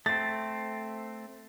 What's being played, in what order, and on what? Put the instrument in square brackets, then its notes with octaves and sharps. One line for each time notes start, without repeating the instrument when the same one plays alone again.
[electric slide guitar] A3 C4 [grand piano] A6